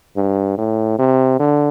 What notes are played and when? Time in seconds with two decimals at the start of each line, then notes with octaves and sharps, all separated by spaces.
0.17 G2
0.58 A2
0.99 C3
1.40 D3